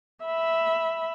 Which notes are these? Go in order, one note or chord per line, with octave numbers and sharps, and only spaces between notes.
E5 B5